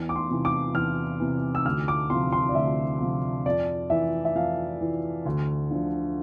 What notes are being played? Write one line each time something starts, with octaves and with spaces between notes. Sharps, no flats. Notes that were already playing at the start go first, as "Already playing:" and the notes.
Already playing: E2
D6
C6
C3 E3
D6
E2 F6
C3 E3
E6
D2 F6
D6
C3 F3 C6
C6
D5
D2 E5
C3 F3
F2 D5
E3 E5
E5
F2 F5
E3
D2
D3 F3